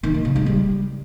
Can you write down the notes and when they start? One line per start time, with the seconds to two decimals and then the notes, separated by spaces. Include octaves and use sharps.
0.03 D#3
0.14 A#3
0.25 C#3
0.36 G#3
0.46 G3